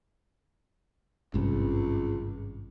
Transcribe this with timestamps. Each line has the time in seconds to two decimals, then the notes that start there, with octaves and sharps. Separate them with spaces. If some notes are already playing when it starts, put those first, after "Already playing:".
1.34 G#1 C#2 G2 C3